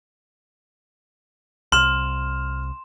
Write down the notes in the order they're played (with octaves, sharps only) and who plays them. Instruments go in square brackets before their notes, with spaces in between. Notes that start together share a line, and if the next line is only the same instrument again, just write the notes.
[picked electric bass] C2 [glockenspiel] C6 E7 [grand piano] F6